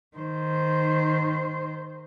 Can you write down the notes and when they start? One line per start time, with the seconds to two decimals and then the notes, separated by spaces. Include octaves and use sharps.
0.17 D#3 C5